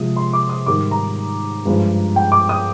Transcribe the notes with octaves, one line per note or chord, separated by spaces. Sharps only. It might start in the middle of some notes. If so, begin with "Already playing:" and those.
Already playing: C3 F3 G#3 D#6
C6
D6
D#6
G#2 D#3 G3 D6
A#5
G2 F3 G#3
G5
D6
D#6